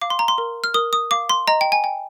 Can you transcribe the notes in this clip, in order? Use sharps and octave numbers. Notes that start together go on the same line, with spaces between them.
F5 D6
C6
A#5
C6
A#4
F6
A#4 D#6
D#6
F5 D6
C6
D#5 A#5
G5
G#5
G5